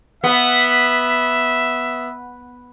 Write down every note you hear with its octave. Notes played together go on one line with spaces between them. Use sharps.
B3 E5